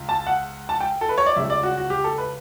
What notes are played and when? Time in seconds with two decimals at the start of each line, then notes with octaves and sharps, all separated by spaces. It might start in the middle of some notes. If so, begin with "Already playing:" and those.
Already playing: C#2
0.09 A5
0.27 F#5
0.69 A5
0.80 G5
1.01 A4
1.09 B4
1.18 C#5
1.26 D5
1.36 C#2 C#3 G3 E5
1.50 D5
1.63 F#4
1.77 F#4
1.90 G4
2.04 A4
2.18 B4